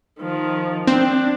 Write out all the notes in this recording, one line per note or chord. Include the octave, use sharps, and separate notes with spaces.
D#3 F3
C4 D4